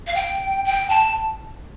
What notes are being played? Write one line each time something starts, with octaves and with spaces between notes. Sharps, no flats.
F5
G5
G5
A5